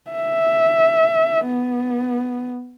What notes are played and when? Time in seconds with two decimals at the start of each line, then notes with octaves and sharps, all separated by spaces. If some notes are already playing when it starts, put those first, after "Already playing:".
0.10 E5
1.45 B3